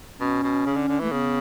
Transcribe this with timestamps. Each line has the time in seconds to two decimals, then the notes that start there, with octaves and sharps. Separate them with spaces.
0.19 B2 C#4
0.43 B2
0.66 C#3
0.77 D3
0.88 D3
1.00 E3 A3
1.12 C#3 B3